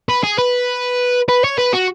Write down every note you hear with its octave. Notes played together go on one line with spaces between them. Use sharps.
B4
G#4
B4
B4
C#5
B4
F#4